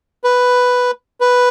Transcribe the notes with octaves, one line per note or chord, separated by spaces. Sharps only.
B4
B4